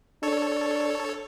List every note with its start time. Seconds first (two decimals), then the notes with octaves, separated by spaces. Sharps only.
0.23 D4 A4 C#5